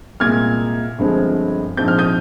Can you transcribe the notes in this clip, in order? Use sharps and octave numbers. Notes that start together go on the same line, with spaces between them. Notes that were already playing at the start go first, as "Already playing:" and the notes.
C2 A#2 G#3 F6 G#6
G1 G2 F3 G#3 C4
A#1 G#2 F3 C4 G6
F6
D#6 G6